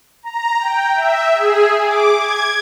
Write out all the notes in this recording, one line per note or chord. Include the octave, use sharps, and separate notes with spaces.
A#5
G5
E5
G#4
D6
G#6